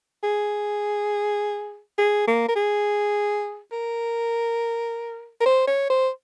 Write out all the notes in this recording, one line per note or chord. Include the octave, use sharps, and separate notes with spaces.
G#4
G#4
A#3
A#4
G#4
A#4
A#4
C5
C#5
C5